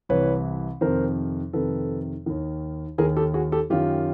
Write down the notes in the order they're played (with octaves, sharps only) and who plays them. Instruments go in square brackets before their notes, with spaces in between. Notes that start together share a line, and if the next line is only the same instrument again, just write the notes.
[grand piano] C2 C3 E3 B4 C#5
F2 C3 D#3 A#4 C5
F2 C3 D#3 A4 B4
D#2 D#3
D#2 D#3 G#4 A#4
G4 A4
F#4 G#4
G4 A4
F#2 D#3 F4 G4